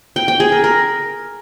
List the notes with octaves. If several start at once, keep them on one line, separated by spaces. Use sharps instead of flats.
G5
G5
G#4
A#4
A#4